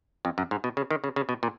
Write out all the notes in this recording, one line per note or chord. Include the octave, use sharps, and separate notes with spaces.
F2
F#2
G#2
B2
C#3
D#3
C#3
C#3
B2
A#2